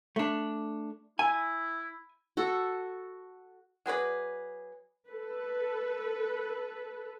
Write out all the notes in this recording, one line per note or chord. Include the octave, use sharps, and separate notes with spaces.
A3 D4
E4 G#5
F#4 A4
F#3 G#4 B4 D5
A4 B4